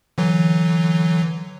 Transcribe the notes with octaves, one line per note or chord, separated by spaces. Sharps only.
D3 E3 F#3